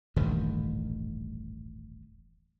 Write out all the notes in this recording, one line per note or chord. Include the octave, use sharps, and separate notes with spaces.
D#1 A1 G2 D#3